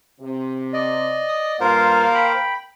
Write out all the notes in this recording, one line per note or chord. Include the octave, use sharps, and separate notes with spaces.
C3
D5 D#5
D#6
G2 A#3 F4 A#4 C5 F5
G5 B5